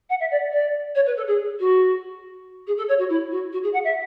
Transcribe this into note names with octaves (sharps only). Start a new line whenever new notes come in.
F#5
E5
D5
D5
C#5
B4
A4
G#4
F#4
G#4
A4
C#5
F#4
E4
F#4
F#4
G#4
F#5
E5